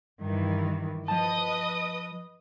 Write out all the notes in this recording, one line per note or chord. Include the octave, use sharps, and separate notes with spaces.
G2 D#3 E3
F3 B4 D#5 A5 D#6